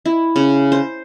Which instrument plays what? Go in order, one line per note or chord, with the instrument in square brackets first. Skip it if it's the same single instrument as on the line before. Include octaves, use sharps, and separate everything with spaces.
[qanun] E4
C#3
C5